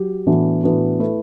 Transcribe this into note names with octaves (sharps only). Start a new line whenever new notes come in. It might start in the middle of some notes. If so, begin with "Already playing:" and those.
Already playing: F#3 G4
A2 E3 B3 D4 F#4
A2 E3 B3 D4 F#4
A3 E4 B4